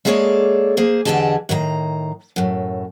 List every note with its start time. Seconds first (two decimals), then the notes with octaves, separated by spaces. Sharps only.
0.05 G#3 A#3 G#4 A4 C#5 D5
0.77 A#3 G#4 C5
1.05 E2 D3 G4 G#4 D#5 A5
1.49 A2 D#3 E5 A#5
2.36 F#2 A2